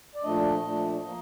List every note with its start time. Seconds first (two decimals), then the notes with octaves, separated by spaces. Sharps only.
0.15 D5
0.23 A#2 F3 A3 D4 D#5
0.65 A#2 F3 A3 D4
1.05 F3 A#3